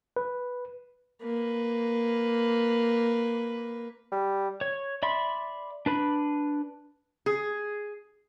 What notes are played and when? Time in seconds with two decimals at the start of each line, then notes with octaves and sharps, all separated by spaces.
0.17 B4
1.23 A#3 B4
4.12 G3
4.61 C#5
5.03 D5 E5 B5 C6
5.86 D4 B4 B5
7.26 G#4